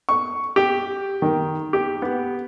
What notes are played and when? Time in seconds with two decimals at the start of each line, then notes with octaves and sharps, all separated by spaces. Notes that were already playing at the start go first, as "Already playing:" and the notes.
0.09 C#6
0.56 G4
1.22 D#3
1.73 G4
2.02 B3